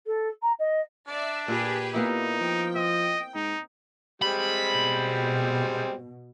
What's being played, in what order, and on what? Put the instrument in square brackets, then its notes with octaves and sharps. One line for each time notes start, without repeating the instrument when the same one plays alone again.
[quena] A4
A#5
D#5
[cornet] D4 [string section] D5 E5
[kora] A#2 [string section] G4 G#4 B4
[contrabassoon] A#2 [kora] A#3 B3 E4 [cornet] D#4
[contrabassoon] F3 [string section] G5
[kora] C4 [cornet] D#5
[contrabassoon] G#2 [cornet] D#4
[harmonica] G3 G#3 C4 [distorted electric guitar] B5
[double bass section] B2